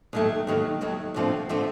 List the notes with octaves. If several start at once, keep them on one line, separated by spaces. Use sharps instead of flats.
D#2 D#3 F#3 A3
D#2 D#3 F#3 A3
D#2 D#3 F#3 A3
D#2 D3 F3 A3 C4
D3 F3 A3 C4